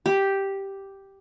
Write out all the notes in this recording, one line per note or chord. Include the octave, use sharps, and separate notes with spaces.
G4